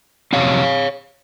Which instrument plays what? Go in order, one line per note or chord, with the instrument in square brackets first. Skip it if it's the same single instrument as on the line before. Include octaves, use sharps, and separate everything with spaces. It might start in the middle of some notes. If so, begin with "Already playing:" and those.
[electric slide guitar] F2 C3 F#3 C4 C#5 F5